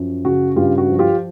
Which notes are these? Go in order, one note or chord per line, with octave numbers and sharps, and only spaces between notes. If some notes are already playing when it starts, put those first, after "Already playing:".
Already playing: F#2 F3
C#3 F#4
G2 F4 G4
F#4
F3
F4 G4